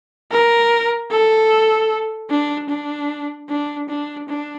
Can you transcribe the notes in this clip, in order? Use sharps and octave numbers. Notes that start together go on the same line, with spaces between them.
A#4
A4
D4
D4
D4
D4
D4